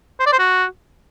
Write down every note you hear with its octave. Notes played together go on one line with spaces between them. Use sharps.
C5
D5
C5
F#4